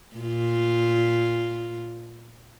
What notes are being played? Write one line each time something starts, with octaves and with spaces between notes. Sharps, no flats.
A#2 F4